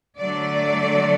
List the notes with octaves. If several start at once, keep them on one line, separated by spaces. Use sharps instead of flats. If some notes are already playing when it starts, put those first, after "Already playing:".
D3 F#3 A3 D5